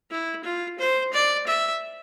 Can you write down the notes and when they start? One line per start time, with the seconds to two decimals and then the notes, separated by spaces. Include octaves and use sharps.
0.10 E4
0.44 F4
0.78 C5
1.13 D5
1.47 E5